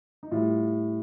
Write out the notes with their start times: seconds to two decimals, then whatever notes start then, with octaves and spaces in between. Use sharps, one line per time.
0.23 D#4
0.31 A2 G3 F4